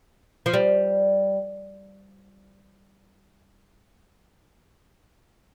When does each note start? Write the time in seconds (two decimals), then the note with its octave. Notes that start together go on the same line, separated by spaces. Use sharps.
0.46 F3
0.54 G3